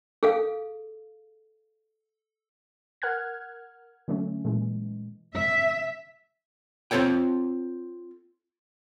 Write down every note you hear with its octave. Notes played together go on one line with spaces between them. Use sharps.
G#4 A4 F5
A#4 F#5 F6 F#6 G#6
D3 F#3 A3 C#4
A#2 E3 G#3
E5
C4 F4 A4 C#5 G5